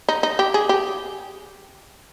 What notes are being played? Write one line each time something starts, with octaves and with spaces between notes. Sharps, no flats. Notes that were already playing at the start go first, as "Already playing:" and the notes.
D#4
D#4
G4
G#4
G4